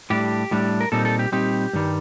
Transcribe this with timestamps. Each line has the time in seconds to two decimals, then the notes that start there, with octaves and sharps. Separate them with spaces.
0.10 A2 G3 D4 G4
0.51 A2 G3 D4
0.81 A#4
0.92 A#2 G3 C4 D#4 A4
1.05 A4
1.19 G4
1.32 A#2 G3 C4 D#4 G4
1.73 G2 D#3 G3